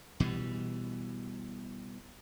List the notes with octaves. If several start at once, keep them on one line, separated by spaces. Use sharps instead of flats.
B2 E3 G3